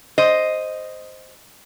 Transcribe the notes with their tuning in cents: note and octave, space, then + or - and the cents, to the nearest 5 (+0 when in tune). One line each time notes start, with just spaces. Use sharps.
C5 +0 D#5 +0